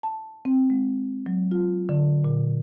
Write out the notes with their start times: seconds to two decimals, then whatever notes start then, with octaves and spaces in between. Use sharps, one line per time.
0.03 A5
0.45 C4
0.70 G#3
1.26 F#3
1.51 F4
1.89 D3
2.24 A#2